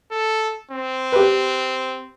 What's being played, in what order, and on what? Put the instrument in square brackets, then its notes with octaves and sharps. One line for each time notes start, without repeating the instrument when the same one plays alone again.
[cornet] A4
C4
[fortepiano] G4 B4